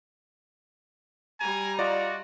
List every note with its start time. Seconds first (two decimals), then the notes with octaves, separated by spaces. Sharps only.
1.40 G3 G#5 A#5
1.79 F4 F#4 D5 D#5